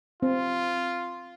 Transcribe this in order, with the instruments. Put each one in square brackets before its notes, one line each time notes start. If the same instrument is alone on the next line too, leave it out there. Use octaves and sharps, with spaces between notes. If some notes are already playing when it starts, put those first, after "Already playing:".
[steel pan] C4 [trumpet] F4